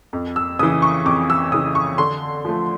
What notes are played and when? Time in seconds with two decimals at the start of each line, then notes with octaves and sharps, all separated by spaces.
0.13 F2
0.36 E6
0.59 C#3 E3 D#6
0.82 C#6
1.05 F2 D6
1.30 E6
1.52 C#3 E3 D#6
1.75 C#6
1.98 D3 C6
2.45 F3 A3